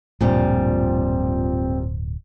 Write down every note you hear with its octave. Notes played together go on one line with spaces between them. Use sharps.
D1 G2 A#2 F3 G3 C4